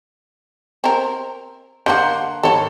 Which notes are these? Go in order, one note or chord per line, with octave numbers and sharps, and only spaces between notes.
C4 A#4
D3 G3 A#3 F#5 C6 G6
G#1 A4 C#5